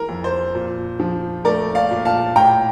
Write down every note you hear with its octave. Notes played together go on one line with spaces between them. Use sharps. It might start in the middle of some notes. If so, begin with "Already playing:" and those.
Already playing: E3 A#4
F2
C5
A#2
F3
A3 A#4 D5
D5 F5
A#2
F5 A5
A2 G5 A#5